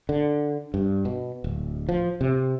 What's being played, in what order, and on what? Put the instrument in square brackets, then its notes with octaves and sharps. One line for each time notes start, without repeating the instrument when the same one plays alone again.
[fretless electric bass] D3
G2
B2
D1
F3
C3